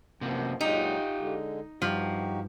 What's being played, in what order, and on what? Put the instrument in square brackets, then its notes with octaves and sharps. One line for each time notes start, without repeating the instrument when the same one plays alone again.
[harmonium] F#2 F3 B3 [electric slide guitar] C3 A#3
[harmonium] A#2 F#3 G#3 [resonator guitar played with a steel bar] D#4 [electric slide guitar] F4 G4
[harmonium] D3 G#3
[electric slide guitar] G2 [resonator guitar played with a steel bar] F3 [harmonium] D#4 F#4 G4